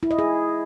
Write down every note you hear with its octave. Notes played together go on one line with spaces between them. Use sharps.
E4
D#5
G#4